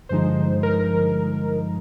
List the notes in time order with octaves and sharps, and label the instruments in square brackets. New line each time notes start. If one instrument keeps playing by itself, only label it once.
[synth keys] G2 D3 F3 G#3 D#4 C5
A#4